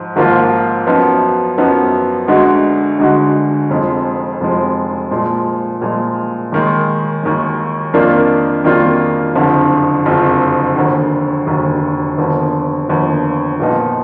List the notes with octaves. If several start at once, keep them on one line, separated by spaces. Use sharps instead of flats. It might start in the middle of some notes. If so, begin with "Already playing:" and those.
Already playing: G#2 F3
G#1 G#2 F3 A#3 F4
F#2 F3 B3 D#4
F#2 F3 B3 D#4
D2 D3 G#3 D#4 F#4
D2 D3 G#3 D#4 F#4
F1 F2 F3 G#3
F1 F2 F3 G#3
A#2 F3 G#3
A#2 F3 G#3
D#2 D#3 G#3
D#2 D#3 G#3
F2 D#3 A#3 D4 F4
F2 D#3 A#3 D4 F4
F#1 F2 D3 F3
F#1 F2 D3 F3
F1 D#2 D3
F1 D#2 D3
F1 D#2 D3 F3 B3
F1 D#2 D3 F3 B3
A#1 A#2 F3 B3 D#4